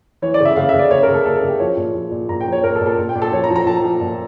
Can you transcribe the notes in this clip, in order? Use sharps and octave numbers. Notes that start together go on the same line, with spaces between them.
E3 C#5
D5
C#3
E5
C#3 F5
C#3 E5
D5
C#3 C#5
A#4
C#3
A4
C#3 A4
A4
C#3
G4
F3 C#5
A#2
F3
A#2
A#2 A#5
G5
F3
C#5
A#2 A#4
A4
A#2
A4
A#2
G5
A#2
A4
F3 C#5
A#5
F3
A#5
F3 A5
F3
A#2